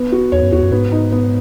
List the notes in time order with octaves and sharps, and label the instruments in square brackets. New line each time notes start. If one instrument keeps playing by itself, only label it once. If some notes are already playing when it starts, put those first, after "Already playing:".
Already playing: [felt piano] B3
F#4
[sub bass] E2 [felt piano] C#5
[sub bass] F#2
[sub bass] E2 [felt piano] F#4
[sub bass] F#2
[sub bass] G#2 [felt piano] B3
[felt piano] D#4
B3